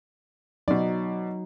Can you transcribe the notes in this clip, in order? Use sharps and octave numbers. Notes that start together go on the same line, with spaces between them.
B2 F#3 D#4 D5